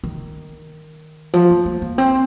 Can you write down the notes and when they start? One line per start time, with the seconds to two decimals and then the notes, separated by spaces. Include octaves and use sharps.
0.04 D#3
1.34 F3
1.50 A#3
1.66 A#3
1.82 A#3
1.98 C4